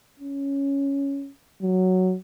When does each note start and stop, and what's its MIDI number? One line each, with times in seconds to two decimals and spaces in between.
0.20 1.30 61
1.62 2.15 54